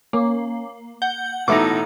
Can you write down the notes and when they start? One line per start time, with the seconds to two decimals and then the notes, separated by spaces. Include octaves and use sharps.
0.13 A#3 C#4
1.02 F#5 G6
1.48 A1 B2 D#4 E4 A4 A#5 D6